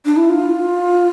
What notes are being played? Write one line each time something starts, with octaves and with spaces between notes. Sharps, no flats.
D4
E4
F4